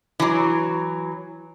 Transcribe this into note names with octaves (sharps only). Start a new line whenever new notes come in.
E3 F#3